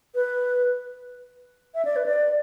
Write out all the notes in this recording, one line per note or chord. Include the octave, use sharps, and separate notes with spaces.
B4
E5
D5
B4
D5